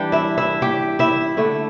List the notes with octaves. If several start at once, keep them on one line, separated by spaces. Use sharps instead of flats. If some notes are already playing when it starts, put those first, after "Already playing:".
Already playing: E3 G3 D4 G4 G5
E4 E5
E4 E5
G4 G5
E4 E5
D3 A3 E4